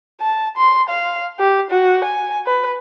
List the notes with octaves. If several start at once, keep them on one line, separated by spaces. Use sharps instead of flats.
A5
C6
F5
G4
F#4
G#5
B4